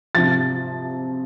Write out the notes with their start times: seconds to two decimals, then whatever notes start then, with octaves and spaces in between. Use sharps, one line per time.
0.15 C3 F3 A6